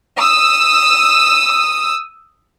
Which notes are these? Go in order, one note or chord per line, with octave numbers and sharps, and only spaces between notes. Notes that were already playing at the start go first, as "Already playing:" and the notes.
D#6 E6